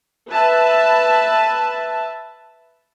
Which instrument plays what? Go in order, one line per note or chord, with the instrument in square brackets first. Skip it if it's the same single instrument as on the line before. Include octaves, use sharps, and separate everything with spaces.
[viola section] B4 E5 A5